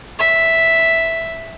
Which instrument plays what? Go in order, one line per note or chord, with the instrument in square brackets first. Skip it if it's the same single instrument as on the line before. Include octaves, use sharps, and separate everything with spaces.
[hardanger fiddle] E5